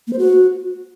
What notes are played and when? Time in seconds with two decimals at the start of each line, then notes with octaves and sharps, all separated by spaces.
0.07 A#3
0.13 C5
0.19 F#4